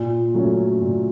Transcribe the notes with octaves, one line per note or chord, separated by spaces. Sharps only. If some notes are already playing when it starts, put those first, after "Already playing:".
Already playing: A#2
F#3 A3 C#4
A#2